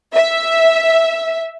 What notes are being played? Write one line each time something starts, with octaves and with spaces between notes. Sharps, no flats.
E5